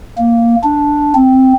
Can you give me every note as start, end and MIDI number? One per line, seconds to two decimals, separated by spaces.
0.18 0.56 58
0.64 1.14 62
1.14 1.53 60